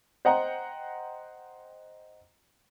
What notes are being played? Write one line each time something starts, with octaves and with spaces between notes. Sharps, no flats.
C5 D#5 F#5 G5 A#5